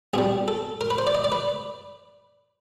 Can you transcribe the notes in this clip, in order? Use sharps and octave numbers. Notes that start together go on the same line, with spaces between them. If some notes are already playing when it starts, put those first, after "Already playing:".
C2 B2 G3 G#4
A4
A#4
B4
C5
D5
D#5
D5
B4